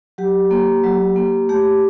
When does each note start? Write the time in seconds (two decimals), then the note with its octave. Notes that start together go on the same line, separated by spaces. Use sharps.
0.18 F#3 G4
0.51 A#3
0.83 F#3
1.16 A#3
1.49 A3 G4